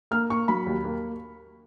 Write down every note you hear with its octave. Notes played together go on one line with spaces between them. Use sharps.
A#3 F6
A#3 C#6
F#3 B5
D#2
A#3